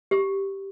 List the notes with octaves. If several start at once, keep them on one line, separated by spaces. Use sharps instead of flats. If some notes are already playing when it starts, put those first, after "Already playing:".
G4